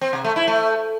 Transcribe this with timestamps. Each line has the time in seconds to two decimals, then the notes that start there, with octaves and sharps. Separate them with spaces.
0.01 C4
0.13 C3
0.24 A3
0.36 E4
0.47 A3